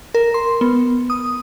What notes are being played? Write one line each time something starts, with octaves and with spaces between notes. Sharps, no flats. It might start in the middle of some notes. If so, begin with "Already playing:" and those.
A#4
C6
B3
D#6